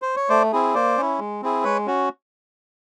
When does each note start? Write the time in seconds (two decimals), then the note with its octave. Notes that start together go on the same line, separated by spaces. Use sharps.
0.02 C5
0.16 C#5
0.29 A3 C5 D5
0.52 C4 E4 G#4
0.74 A#3 C5 D5
0.97 C#4 E4
1.19 G#3
1.42 C4 E4 G#4
1.64 G#3 B4 C#5
1.87 C#4 F#4